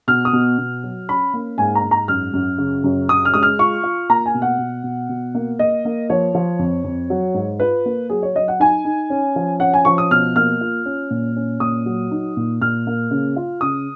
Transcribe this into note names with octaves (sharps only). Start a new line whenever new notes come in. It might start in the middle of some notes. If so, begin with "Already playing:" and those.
B2 F6
D#6
B2
B2
F#3
C#4 B5
A#3
G#2 G#5
A#5
G#2
A#5
F#2 F6
F#2
C#3
F#2
C#3 D#6
F6
G#3 D#6
F6
F4 C#6
F4
A#3 A#5
G#5
B2
F#5
B2
B2
B2
A#3
A#3 D#5
A#3
F3 C#5
F3
F2
F2
F#3
G#2
F4 B4
A#3
F#3 G#4
C#5
F#3 D#5
F#5
D#4 G#5
D#4
C#4
F3
C#4 F#5
G#5
F3 C#6
D#6
B2 F6
A#3 F6
F4
C#4
A#2
C#4
A#2 D#6
F#3
D#4
A#2
A#2 F6
A#3
C#3
F4
C#3 D#6